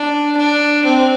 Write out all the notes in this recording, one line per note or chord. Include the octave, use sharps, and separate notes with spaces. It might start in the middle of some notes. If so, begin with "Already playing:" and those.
Already playing: D4
D4
C4